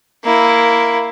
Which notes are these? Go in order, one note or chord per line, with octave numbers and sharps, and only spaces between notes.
A#3 E4